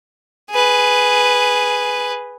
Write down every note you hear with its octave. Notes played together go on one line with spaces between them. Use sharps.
G#4 B4